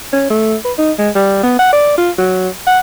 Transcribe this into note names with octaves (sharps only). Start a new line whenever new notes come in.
C#4
A3
B4
D#4
G#3
G3
B3
F#5
D5
F4
F#3
F#5